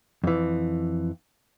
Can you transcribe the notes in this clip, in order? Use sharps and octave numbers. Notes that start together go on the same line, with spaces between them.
F2 E3